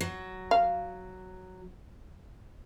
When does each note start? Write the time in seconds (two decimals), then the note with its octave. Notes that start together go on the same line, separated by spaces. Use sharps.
0.01 F#3
0.51 F5